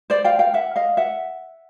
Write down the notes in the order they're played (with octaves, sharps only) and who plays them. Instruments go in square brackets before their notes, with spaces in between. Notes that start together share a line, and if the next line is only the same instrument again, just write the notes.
[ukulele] C5 D5
F5 G5
F5 G5
E5 F#5
D#5 F5
E5 F#5